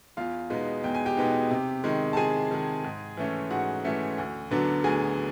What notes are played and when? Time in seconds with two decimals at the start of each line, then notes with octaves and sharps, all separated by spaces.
0.17 E2 F4 F5
0.50 B2 G#3 B3 D#4
0.84 E2 G5
0.95 G#5
1.05 G4 G5
1.17 B2 G#3 B3 D#4
1.51 C3
1.84 D#3 G#3
2.13 A5
2.17 C3 G#4 G#5
2.51 D#3 G#3
2.84 G#2
3.17 E3 A3 C#4
3.50 G#2 F#4 F#5
3.84 E3 A3 C#4
4.18 D2
4.51 D3 F#3 B3 D4
4.84 D2 G#4 G#5